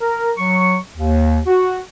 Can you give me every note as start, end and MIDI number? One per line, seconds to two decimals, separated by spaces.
0.01 0.31 70
0.38 0.77 54
0.38 0.77 85
0.96 1.39 39
1.47 1.79 66